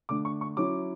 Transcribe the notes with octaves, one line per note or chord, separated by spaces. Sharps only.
D3 A3 D4 D6
C#6
C#6
F#3 C#4 E4 D6